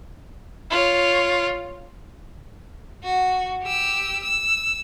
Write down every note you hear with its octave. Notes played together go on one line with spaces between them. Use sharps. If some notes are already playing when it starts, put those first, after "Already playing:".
F4 C#5
F#4
G4 E6
E6